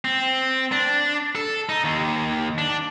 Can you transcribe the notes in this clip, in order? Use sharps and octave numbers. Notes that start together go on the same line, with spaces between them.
C4
D4
A4
D#4
D#2
D4